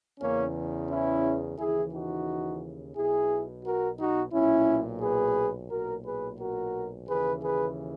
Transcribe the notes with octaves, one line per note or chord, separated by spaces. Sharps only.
E2 C#3 E3 A#3 C#4
C#4 E4
D#2 C#3 E3 E4 G#4
D#4 F#4
B1 B2 E4 G#4
F#4 A#4
D#4 F#4
B1 A#2 C#4 E4
G#4 B4
B1 A#2 F#4 A#4
G#4 B4
F#4 A#4
D#2 C#3 E3 G#4 B4
G#4 B4